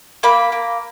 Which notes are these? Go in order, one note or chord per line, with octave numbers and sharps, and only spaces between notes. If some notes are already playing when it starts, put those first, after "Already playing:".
A#3 B5
A#3